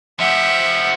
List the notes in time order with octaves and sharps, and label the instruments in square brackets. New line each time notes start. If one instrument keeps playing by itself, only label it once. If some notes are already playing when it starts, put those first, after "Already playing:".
[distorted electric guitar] F3 G4 [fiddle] E5 [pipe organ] F#5